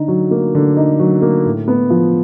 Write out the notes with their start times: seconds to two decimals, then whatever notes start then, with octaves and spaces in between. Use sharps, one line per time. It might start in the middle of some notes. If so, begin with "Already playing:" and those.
Already playing: D3 D#4
0.08 F#3
0.31 A#3
0.55 D3
0.77 D#4
0.99 F#3
1.22 A#3
1.45 A2
1.68 B3
1.90 F3